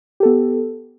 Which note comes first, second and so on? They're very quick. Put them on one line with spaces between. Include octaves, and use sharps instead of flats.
G4 A4 B3